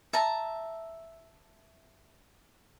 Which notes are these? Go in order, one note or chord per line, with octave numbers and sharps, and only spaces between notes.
E5 A5 A#5